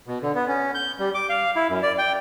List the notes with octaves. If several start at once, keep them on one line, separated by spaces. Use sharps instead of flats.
B2
D3
B3
C#4
G6
G3
D6
F5
E4
F#2
D5
G5